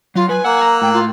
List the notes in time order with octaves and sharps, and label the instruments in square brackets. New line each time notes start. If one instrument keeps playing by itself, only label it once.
[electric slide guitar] F#3 [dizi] F4
[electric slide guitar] B4 [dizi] G#5
[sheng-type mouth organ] A#3 E6 F#6 [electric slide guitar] F#5
[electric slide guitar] A#5
[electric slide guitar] A2 [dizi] G5
[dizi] F4